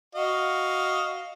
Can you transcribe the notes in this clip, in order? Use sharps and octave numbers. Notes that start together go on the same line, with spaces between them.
F#4 D#5 F5